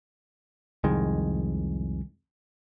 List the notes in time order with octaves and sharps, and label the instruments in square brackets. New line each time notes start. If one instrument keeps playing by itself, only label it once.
[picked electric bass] C2 F2 D#3 G#3